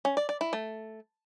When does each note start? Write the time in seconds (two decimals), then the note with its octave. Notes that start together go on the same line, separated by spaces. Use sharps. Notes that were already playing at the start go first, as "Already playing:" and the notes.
0.05 C#4
0.17 D5
0.29 D5
0.41 E4
0.53 A3